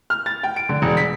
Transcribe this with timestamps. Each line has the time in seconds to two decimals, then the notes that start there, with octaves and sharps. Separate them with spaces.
0.10 F6
0.26 A6
0.43 G5
0.56 D7
0.69 D3
0.82 E1
0.97 B6